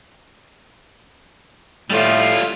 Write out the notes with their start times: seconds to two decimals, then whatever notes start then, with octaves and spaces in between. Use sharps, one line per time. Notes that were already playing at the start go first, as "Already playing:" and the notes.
1.90 A2 G3 F4